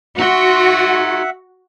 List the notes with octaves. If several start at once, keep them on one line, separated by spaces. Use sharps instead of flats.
D#4 F#4 E5 F#5 C6